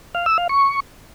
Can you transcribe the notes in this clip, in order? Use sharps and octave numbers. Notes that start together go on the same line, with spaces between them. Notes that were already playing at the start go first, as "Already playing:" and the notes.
F5
E6
F5
C#6